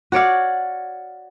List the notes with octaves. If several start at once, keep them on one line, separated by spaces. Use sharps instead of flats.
F#4 C#5 D5 F5